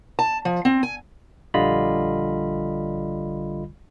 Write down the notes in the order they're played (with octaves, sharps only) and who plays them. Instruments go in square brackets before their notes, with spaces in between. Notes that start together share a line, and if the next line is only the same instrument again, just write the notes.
[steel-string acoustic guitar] A5
F3
C4
G#5
[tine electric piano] A#1 D3 G3 F4 D#5 B5